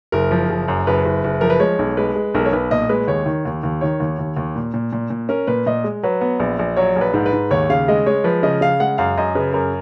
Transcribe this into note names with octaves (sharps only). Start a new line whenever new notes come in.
F#1 A#4
F3
F#1
F#2
F#1 B4
F#1
F#1
F3 A#4
B4
G#3 C#5
B1
G#3 B4
G#3
B1 A#4
C#5
B1 B4
A#2 D#5
G#3 B4
D#2 C#5
D#3
D#2
D#2
D#3 C#5
D#2
D#2
D#2
A#2
A#2
A#2
A#2
C#4 A#4
A#2 B4
A#2 D#5
G#3
F#3 B4
B3
A#1
A#1
F#3 C#5
A#1
B4
G#2
B4
G#2
D#2 C#5
C#3 F5
G#3 D#5
G#3 C#5
F3 B4
C#3 D#5
C#3 F5
G#3 F#5
F#2 F5
F#2 D#5
C#3 B4
F#2 A#4